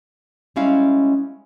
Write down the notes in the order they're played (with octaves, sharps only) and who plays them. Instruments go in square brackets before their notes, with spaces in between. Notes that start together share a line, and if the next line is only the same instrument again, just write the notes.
[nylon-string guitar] G3 G#3 C#4 E4 F5